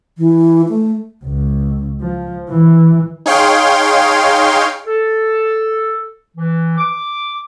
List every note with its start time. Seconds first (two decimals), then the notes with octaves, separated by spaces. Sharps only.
0.18 E3
0.69 A3
1.24 C#2
2.00 F3
2.50 E3
3.26 D#4 G#4 C#5 F5 G5 C6
4.87 A4
6.37 E3
6.78 D6